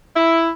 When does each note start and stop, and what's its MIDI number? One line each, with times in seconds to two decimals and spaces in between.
0.16 0.50 64